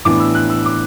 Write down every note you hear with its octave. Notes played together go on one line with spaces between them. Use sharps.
A2 E3 B3 D4 D6
E6
F#6
E6
D6